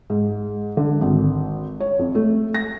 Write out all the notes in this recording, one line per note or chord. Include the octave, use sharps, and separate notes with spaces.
G#2
D3
G#1
C#5
F2
A3
A#6